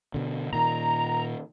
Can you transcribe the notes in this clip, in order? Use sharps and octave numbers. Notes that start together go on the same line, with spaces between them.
B2 D3
A#2 D#3 A#5